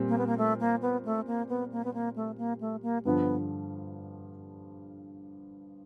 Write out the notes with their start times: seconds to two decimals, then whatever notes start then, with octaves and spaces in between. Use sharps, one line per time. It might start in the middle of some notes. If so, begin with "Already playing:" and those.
Already playing: A#2 G3 C4
0.09 A#3
0.18 B3
0.27 A#3
0.38 A3
0.60 A#3
0.82 B3
1.05 A3
1.27 A#3
1.49 B3
1.72 A#3
1.85 B3
1.94 A#3
2.16 A3
2.38 A#3
2.61 A3
2.83 A#3
3.05 G2 D3 F3 B3